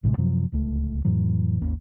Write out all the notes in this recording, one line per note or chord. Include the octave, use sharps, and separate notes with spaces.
A1 A2 C3 G#3
F#2 C3 F3 F#3
D1 C#2 A3
F2 A2 E3 F#3
G#1 D#2 A#3 C#4